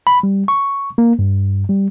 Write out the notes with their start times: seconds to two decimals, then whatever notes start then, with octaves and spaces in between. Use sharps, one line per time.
0.07 B5
0.23 G3
0.48 C#6
0.98 A#3
1.19 G2
1.69 G3